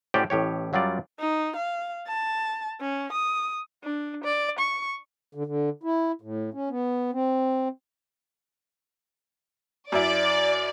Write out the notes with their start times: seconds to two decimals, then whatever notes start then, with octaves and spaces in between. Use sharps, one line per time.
0.14 A2 C#4 F#4 G4 C5 D5
0.30 A1 A2 G4 C#5
0.73 F#2 F#3 G3 F4 D5
1.19 D#4
1.56 F5
2.07 A5
2.80 C#4
3.12 D#6
3.83 D4
4.24 D5
4.59 C#6
5.35 D3
5.46 D3
5.83 E4
6.21 A2
6.54 C#4
6.69 B3
7.13 C4
9.92 F#2 E4 D5